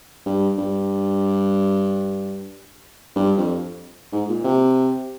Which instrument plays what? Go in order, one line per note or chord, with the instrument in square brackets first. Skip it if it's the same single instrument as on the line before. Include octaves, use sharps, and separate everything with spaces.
[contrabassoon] G2
G2
G2
F2
G#2
A#2
C3